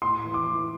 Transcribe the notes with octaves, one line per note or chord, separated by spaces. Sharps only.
A2 C6
E3
D6
E3